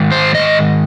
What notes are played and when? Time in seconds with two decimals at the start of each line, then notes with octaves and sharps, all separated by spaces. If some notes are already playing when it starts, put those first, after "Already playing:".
Already playing: G#2 D#3
0.12 C5
0.35 D#5